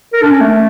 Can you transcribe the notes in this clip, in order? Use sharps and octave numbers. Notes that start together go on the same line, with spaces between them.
A#4
D4
C#4
A3